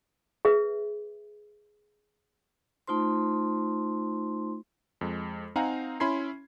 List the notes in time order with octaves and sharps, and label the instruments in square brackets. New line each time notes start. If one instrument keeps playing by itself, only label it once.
[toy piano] G#4 B4 E5
[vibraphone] A3 D#4 F4 C5 C6
[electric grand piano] F2 G#3
C4 D#4 F5 F#5 G#5 A#5
C#4 E4 B5 C6 G#6 C7